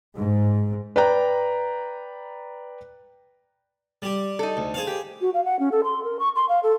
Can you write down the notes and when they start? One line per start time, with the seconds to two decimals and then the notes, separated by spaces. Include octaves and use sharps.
0.15 G#2
0.96 B4 D5 G5 A#5
4.02 G3 G4
4.39 D#4 A4
4.57 D2
4.74 G#4 C5 F5
4.87 G4
5.21 F#4
5.34 F5
5.45 F#5
5.59 C#4
5.72 A4
5.84 C6
6.04 A#4
6.19 C#6
6.36 C6
6.49 F5
6.63 A4